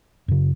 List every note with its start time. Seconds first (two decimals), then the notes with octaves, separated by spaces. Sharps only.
0.28 F#2 C#3